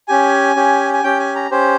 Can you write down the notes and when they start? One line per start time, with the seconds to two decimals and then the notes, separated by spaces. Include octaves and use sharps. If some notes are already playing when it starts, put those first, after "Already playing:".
0.08 C#4 G4 G#5
0.56 C#4 G4
0.93 G#5
1.03 C#4 G4 G5
1.19 G#5
1.36 A#5
1.51 C#4 G4 C5